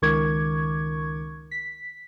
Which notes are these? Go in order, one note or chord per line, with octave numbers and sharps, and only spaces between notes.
C#2 D#3 A#4 C#6 D6 G#6
B6